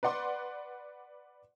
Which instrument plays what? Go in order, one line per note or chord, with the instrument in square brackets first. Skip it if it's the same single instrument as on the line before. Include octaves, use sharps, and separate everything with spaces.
[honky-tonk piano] B4 D5 F#5 C6 D6